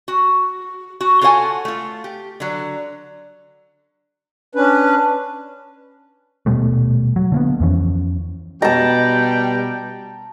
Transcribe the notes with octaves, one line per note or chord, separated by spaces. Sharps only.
F#4
F#4
F4 F#4 A4 C#5 F#5 G#5
A3 F4
G4
D3 F#3
C#4 D4 B4
D#1 B2 G3 A3
F#3
D3 A#3 B3
F2 E3 C#4
B2 G3 D#5 G5 A5 A#5